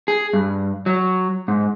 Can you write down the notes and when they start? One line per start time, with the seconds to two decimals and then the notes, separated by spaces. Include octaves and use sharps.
0.08 G#4
0.33 G2
0.86 F#3
1.48 G#2